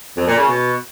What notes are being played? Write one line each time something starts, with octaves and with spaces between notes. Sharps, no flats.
F2
A#2
C#3
B2